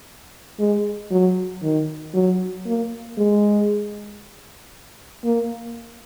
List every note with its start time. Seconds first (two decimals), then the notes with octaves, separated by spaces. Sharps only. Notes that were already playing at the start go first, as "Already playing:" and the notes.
0.59 G#3
1.11 F#3
1.63 D#3
2.14 F#3
2.66 A#3
3.18 G#3
5.24 A#3